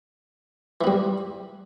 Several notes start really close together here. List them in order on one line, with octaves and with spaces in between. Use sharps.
E3 B3 G3